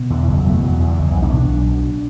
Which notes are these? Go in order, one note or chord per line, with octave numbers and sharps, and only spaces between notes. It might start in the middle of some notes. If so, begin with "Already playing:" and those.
Already playing: B2
E2 D3
F#1 E3
F#3
B2 A3
E2 F#3
E2
E3
F#1
B1
D4
C#4
B2 D4
B1
B2